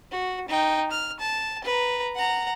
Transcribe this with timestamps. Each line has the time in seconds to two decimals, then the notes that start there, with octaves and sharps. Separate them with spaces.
0.11 F#4
0.48 D#4 G5
0.91 F6
1.20 A5
1.64 B4 A#5
2.15 F#5 A#5